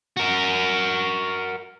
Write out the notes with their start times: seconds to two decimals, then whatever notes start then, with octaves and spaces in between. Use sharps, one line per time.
0.17 F#4 A#4